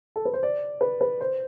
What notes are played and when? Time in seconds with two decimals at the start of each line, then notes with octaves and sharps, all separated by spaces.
0.16 A4
0.25 B4
0.33 C5
0.43 D5
0.81 B4
1.01 B4
1.21 C5